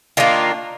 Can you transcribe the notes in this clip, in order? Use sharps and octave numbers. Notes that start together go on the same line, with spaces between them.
D#3 F#3 A#3 D4 F4